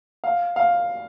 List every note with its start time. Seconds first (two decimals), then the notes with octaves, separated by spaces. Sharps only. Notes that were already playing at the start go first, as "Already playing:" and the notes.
0.24 F5
0.56 F5